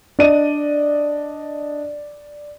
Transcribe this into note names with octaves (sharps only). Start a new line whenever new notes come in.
D4 D5 D#5 D#7